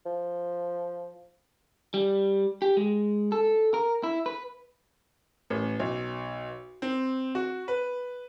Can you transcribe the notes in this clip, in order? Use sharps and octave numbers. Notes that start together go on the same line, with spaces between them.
F3
G3
G4
G#3
A4
A#4
E4
B4
A1
B1
C4
F#4
B4